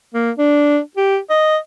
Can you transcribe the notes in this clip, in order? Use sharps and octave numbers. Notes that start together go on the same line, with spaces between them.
A#3
D4
G4
D#5